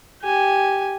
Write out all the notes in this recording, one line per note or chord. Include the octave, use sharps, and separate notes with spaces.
G4 G#5